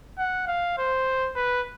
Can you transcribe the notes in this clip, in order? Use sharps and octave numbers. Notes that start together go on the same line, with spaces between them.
F#5
F5
C5
B4